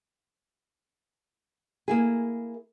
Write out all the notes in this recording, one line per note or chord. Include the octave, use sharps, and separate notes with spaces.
A#3 E4 G#4